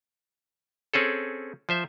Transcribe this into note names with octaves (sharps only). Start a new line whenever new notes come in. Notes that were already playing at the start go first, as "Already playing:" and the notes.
C4 C#4 G#4 A4
F3 C5 E5